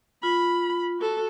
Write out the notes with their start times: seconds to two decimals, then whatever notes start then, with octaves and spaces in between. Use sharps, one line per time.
0.23 F4 B5
0.99 F#4 A4